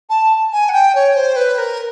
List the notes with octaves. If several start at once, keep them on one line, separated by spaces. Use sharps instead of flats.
A5
G#5
F#5
G5
C#5
C5
B4
A#4